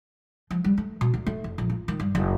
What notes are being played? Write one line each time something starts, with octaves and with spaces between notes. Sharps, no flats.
F3
G3
A3
B2
D2
A3
F1
A#1
F4
D#3
G2
F#1